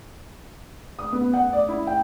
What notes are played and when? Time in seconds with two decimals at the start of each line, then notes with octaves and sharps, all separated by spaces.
0.99 D#6
1.13 B3
1.34 F#5
1.53 D5
1.68 E4
1.87 G5